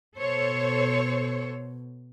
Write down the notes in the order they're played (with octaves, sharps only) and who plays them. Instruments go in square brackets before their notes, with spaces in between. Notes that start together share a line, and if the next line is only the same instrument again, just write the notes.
[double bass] B2 [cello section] A4 C5 C#5